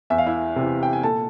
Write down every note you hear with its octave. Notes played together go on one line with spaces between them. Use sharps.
E2 E5
F5
E4 E5
C3 E3
G5
G#5
A#2 A4 A5